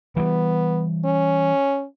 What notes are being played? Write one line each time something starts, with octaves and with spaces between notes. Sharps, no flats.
E3 G3 B3
C#4